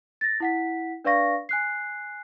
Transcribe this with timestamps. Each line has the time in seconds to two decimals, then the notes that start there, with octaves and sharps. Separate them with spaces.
0.21 A6 A#6
0.40 E4 F#5 B6
1.04 D4 B4 D5 F5 C#6 A#6
1.49 G#5 F#6 C7